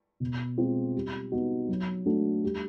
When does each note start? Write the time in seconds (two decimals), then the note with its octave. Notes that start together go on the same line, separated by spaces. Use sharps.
0.20 B2
0.58 G#3 C4 F4
0.95 G3
1.32 B3 D#4 F#4
1.69 F#3
2.06 A3 D4 F#4
2.43 G3